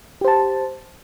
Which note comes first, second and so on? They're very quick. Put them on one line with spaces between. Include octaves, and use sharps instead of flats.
G4 C5 A5